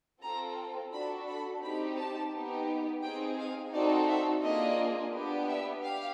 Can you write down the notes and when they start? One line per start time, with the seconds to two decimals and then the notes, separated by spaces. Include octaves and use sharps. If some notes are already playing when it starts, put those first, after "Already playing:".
0.22 C4 F4 A4 A#5
0.92 D4 F#4 A4 B5
1.27 B5
1.62 C4 D#4 G4 B5
1.97 A5
2.33 B3 D#4 G4
3.02 C4 D#4 G#4 G5
3.38 F5
3.72 C4 D#4 F#4 A4 D5
4.08 E5
4.42 A#3 D4 F4 G#4 D#5
5.12 B3 D4 G4
5.48 E5
5.83 G4 F5